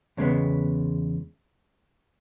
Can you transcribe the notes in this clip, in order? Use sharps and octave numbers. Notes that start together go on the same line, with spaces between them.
E2 C#3 G#3 B3